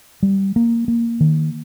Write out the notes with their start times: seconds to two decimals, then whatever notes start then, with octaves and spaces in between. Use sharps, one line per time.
0.23 G3
0.56 A#3
0.88 A#3
1.20 D#3